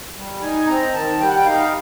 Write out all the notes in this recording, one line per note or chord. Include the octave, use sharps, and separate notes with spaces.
G3
D#4 G#5
C4 A#5
D#3 A5
G3 G5
F#5
G5
D#4 F5